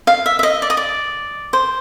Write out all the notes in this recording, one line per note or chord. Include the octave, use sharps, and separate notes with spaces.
F5
E5
E5
D#5
D5
D#5
D5
C5